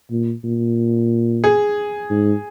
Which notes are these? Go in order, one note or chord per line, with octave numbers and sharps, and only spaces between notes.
A#2
A#2
G#4
G#2